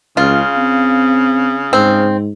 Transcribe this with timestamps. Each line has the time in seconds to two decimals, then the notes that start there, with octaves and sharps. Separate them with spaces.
0.17 C#2 C#3 F4
0.57 C4
1.73 G#2 C4